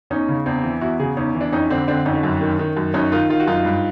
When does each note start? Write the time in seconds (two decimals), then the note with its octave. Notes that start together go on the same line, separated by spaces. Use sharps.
0.10 E2 C#4 D#4
0.29 C#3
0.46 E2 C4 D4
0.64 E3
0.81 E2 E4 F#4
0.99 C#3 F#4 G#4
1.17 E2 C#4 D#4
1.35 E3
1.41 D4
1.53 F2 C#4 D#4
1.70 D3 C4 D4
1.88 D3 C4 D4
2.05 F2 C#4 D#4
2.23 F#2
2.41 D#3
2.59 D#3
2.77 F#2
2.94 F#2 C#4 D#4
3.12 D#3 D#4 F4
3.30 D#3 D#4 F4
3.40 F#4
3.47 F#2 D#4 F4
3.65 G2